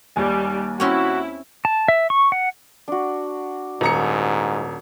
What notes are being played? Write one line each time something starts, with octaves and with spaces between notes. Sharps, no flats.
D#2 G3 G#5
C4 C#4 E4 F#4 C#5
A5
E5
C#6
F#5
D4 F#4
D#1 G#2 A#5 C#7